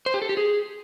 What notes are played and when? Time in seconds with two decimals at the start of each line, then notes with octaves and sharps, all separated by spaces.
0.06 C5
0.14 G4
0.22 A4
0.29 G4
0.37 G#4